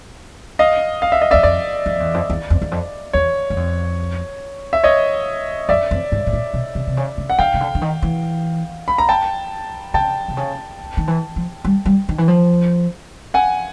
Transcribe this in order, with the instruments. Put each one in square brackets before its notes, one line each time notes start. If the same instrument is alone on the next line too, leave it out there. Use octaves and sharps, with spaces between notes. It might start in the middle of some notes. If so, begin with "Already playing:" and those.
[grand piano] D#5 F5
F5
E5
D#5
[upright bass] E2 [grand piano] D5 E5
[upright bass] F2 [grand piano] D5
[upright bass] F2
E2
F2
E2
F2
E2
F2
[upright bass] E2 [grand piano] C#5
[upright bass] F#2
F2
[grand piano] E5
C#5 D#5
[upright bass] F#2 [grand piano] D5 E5
[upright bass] F2
G#2
A2
A#2
B2
C3
C3
C#3
C#3
[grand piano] F#5
[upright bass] D3 [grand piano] F5 G5
[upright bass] C#3
D3
D3
D#3
E3
[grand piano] B5
A#5
G5 A5
[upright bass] C#3 [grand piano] G5 A5
[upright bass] C3
C#3
D#3
E3
F3
G3
G3
D#3
E3
F3
[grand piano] F#5 G#5